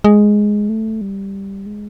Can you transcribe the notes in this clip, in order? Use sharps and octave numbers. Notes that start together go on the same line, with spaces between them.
G#3
A3
G3
G#3